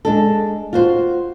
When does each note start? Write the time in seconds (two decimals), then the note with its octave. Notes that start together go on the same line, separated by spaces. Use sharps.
0.05 G#3 D4 A4
0.73 F4 F#4 C5